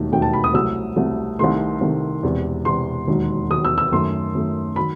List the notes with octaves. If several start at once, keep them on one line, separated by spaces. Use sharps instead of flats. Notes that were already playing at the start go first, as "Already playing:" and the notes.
Already playing: E1 D#2 D#3 F#3 A3
E1 D#2 D#3 F#3 A3 G5
A5
B5
D#6
C2 C3 F#3 A3 E6
C2 C3 F#3 A3
C2 C3 D#3 A3 C6
C2 C3 D#3 A3
E1 E2 C3
E1 E2 C3 C6
E1 D#2 D#3 F#3
E1 D#2 D#3 F#3 D#6
E6
E6
F#2 D#3 A3 C6
F#2 D#3 A3
D#3 F#3 B5